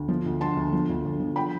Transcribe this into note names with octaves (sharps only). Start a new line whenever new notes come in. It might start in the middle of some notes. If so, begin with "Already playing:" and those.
Already playing: D2
F3
D2
D3 A5 C6
D2
F3
D2
D2
F3
G5 B5